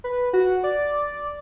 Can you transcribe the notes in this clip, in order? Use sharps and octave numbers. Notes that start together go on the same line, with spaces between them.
B4
F#4
D5